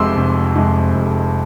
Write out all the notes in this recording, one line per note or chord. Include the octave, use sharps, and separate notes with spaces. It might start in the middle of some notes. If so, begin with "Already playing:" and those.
Already playing: F1 F2 C3 G#3 C6 D6 E6
F1
F2 C3 G#3
F1